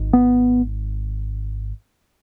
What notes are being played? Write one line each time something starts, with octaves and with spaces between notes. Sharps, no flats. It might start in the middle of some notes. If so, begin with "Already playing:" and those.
Already playing: G#1 G#2
B3